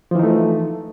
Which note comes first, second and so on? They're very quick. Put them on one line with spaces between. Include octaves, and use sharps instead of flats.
F3 E3 D#4 A3